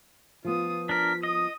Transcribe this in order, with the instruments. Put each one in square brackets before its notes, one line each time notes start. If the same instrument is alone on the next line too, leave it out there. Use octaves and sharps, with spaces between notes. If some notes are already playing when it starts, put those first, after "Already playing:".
[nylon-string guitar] F3 B3 [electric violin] F4 D#6
[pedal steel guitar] D4 A#4 [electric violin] B6
[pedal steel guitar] D#5 [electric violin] D#6